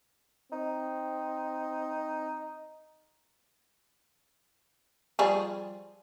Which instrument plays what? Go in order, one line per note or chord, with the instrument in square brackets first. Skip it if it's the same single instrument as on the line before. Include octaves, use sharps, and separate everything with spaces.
[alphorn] C4 [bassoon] D#4
[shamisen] F3 G3 G#4